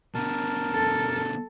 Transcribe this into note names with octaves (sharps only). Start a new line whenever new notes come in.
B2 D3 A#4 A5
A4